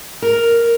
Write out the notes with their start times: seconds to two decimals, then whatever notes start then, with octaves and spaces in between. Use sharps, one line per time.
0.22 A#4